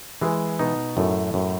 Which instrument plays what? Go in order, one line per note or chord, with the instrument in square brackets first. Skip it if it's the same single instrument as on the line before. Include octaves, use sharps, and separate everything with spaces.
[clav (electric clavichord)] E3 [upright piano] G#3 G#4
[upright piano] B2 B3 [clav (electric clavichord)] D#4
[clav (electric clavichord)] F#2 [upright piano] A2 A3
[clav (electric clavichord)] F#2